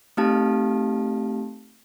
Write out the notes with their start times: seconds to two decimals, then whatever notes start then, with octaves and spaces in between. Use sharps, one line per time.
0.17 A3 C4 D#4 G4 F5 A5